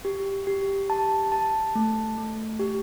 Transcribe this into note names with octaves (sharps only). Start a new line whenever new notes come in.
G4
G4
A5
A5
A3
A3
G4